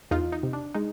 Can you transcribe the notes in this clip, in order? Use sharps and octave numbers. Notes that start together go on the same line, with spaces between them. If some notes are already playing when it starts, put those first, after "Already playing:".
E2 D#4 F4
D#4
C3
D4
G#3 D#4